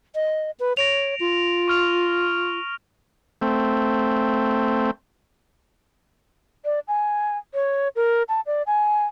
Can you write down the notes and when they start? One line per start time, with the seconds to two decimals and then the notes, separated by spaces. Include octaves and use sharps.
0.15 D#5
0.60 B4
0.77 C#5 A#6 D7 F7
1.20 F4
1.68 C#6 F6 F7
3.42 A3 C4
6.65 D5
6.88 G#5
7.54 C#5
7.96 A#4
8.29 A5
8.46 D5
8.67 G#5